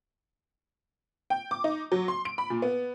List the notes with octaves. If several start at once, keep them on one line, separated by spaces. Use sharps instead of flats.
G5
D6
D#4
F#3
C6
D7
B5
A#2
B3